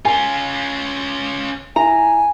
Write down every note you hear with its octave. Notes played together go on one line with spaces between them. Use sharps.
C#4 F4 G#5
E4 G#5 A#5